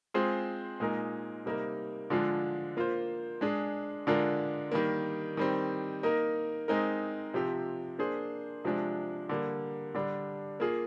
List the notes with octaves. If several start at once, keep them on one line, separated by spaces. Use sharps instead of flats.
G#3 C4 F4 G#4 C5
A#2 G#3 D#4 A#4
C3 G3 A#3 D#4 A#4
D3 F3 G#3 D4 F4
A#3 F4 C5
G#3 D4 G#4
D3 G#3 D4 F4 A#4
D#3 G3 A#3
D#3 G3 C4
A#3 D#4 A#4
G#3 C4 D#4 A#4
C3 F3 C4 G4
A#3 D4 G#4 C5
C3 F3 G#3 D4
D3 G3 A#3
D3 G3 D4
A#3 F4 G#4